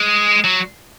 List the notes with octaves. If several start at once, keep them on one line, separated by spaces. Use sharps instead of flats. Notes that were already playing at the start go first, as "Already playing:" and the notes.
Already playing: G#3
F#3